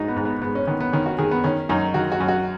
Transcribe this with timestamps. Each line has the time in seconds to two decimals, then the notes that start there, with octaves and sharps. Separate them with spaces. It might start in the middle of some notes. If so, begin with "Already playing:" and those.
Already playing: G#2 D#4 F#4
0.08 B3
0.16 G#2
0.25 B3
0.42 G#2 B3
0.55 C#4
0.67 D#3 B3
0.80 B3
0.92 D#3 C#4
1.06 F#4
1.18 D#3 G#4
1.31 B3
1.44 D#3 C#4
1.69 F#2 D#4
1.94 D#3 F#4
2.12 F#4
2.20 F#2
2.28 F#4